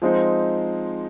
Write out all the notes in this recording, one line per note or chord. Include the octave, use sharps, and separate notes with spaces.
F3 G#3 C4 D#4